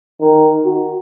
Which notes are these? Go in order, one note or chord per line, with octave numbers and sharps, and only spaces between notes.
D#3
F#4